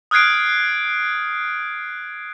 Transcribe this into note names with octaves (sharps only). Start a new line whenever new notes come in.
D#6 F6 F#6 G#6 C7 D7